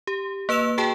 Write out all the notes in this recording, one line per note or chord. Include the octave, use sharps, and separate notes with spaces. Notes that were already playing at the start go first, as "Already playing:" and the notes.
G4
A#3 B4 E6 E7 F7
F#4 G#4 G5 A5